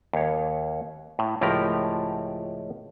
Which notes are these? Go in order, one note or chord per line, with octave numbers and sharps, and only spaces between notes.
D#2 C#5
A2
C#2 A2 F3 G4 A#4 A#5